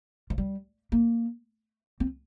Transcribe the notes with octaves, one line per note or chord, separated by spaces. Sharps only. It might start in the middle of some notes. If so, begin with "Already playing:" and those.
F3
G3
A#3
C4